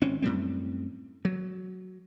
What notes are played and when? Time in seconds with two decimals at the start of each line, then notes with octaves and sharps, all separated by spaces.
0.01 G#1 C4 C#4
0.22 F#2 A2 G3 C4
1.25 F#3